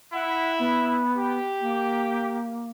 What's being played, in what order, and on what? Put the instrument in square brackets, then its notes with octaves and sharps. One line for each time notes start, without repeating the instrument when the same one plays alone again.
[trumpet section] E4 [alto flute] F#5
[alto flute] B3
[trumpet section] G4
[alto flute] A#3